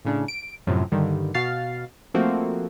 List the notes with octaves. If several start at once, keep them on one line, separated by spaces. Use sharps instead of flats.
A2 C#3 D4
D7
F#2 A2 C3 F3
G2 D3 D#3 G3
B2 F#4 F5 F6 A6 C7
F3 A3 A#3 C4 F#4